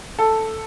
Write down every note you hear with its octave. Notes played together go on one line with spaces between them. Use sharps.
A4